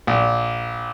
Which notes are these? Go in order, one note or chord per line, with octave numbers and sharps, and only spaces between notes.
A#1